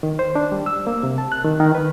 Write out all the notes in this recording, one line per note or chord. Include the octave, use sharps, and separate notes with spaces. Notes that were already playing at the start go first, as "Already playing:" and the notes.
D#3
C5
D4
G3
E6
A#3
C3
A5
F#6
D#3
D#3
B4